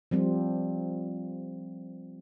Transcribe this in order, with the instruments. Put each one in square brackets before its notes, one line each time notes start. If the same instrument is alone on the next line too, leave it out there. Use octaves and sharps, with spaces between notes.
[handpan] F3 G3 C4